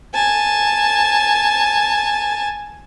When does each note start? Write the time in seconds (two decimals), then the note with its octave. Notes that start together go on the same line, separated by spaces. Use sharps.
0.14 G#5 A5